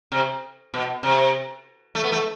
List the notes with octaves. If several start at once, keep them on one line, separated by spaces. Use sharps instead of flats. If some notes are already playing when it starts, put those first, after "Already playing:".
C3
B2
C3
A3
B3
A3